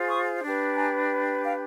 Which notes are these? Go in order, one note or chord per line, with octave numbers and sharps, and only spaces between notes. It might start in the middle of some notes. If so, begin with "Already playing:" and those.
Already playing: F4 G#4 C5
C#6 D#6
D4 G4 B4
G#5 A#5
F5 G5